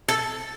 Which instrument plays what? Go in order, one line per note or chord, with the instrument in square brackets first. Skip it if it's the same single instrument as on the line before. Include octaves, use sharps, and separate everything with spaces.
[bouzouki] A4